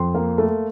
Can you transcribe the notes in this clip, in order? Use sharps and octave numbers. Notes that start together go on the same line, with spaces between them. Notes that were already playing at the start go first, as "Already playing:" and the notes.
Already playing: F2 C6
A#3
A3